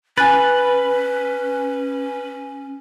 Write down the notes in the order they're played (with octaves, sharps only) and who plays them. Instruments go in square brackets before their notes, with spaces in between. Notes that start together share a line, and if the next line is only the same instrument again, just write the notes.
[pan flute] C#4 [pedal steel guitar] B4 [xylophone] G#5 F#6 A6